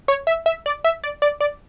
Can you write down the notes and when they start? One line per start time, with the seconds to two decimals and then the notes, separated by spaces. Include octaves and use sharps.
0.08 C#5
0.27 E5
0.46 E5
0.66 D5
0.84 E5
1.04 D5
1.22 D5
1.41 D5